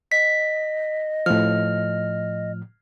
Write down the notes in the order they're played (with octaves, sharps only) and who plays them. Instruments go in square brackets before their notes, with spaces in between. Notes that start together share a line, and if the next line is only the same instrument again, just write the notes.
[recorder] D#5 [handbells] B6
[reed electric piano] A2 F3 [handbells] F6